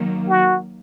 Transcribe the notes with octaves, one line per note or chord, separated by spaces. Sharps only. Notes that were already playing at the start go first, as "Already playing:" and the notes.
Already playing: D#3 F#3 A#3
F#4